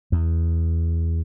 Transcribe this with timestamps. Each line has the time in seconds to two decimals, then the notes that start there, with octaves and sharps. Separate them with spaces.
0.12 E2